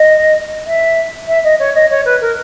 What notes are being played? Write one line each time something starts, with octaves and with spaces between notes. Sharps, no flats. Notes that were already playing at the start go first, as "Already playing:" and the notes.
Already playing: D#5
E5
E5
D#5
C#5
D#5
C#5
B4
A#4